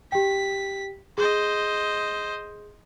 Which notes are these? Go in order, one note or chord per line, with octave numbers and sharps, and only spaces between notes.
G4 G5 B6
G#4 C5 D#5